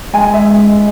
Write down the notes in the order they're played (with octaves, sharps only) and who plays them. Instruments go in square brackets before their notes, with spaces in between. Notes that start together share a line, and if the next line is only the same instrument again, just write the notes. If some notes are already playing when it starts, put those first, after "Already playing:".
[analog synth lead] G#3 [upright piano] G#5
[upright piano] E5